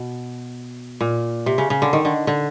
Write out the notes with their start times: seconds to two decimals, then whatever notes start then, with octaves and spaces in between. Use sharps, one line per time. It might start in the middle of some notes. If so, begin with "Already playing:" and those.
Already playing: B2
1.01 A#2
1.46 C3
1.58 C#3
1.70 C#3
1.82 D3
1.93 D#3
2.05 D3
2.27 D3